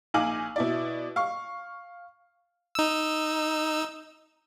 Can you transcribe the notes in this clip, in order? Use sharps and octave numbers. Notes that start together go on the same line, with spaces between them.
A#1 D#4 F5 G#5 D6 F#7
B2 E4 D5
F5 C#6
D#4 E6